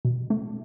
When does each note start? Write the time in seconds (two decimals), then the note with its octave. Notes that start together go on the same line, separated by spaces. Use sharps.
0.05 B2
0.30 A3